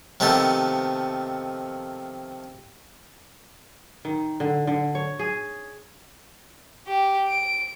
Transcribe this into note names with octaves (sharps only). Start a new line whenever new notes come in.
C3 D#3 F3 A3 B3 A4
D#3
D3
D3
C#5
G#4
G4
D7